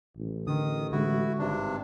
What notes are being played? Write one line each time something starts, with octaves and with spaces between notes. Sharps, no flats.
A1
D3 D#3 D#6
D3 G#3 E4 F#4
G#1 G2 C3 D4